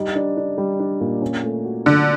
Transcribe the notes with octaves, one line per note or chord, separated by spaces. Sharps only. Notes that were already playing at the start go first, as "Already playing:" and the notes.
Already playing: G3 D#4
D4
D4
G3
D4
A#2
C#4
A3
F#4
D3 F#4